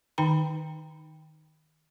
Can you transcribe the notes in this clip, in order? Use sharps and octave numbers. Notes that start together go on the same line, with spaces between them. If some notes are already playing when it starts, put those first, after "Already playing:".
D#3 D#4 G5 A#5 B5